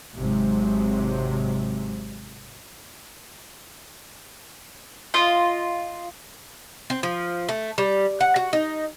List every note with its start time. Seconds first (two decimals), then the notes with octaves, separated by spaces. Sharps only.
0.17 G#1 C3 F#3 G#3
5.14 F4 D#5
6.90 C4
7.03 F3
7.49 A3
7.78 G3
8.21 F#5
8.36 F#4
8.53 D#4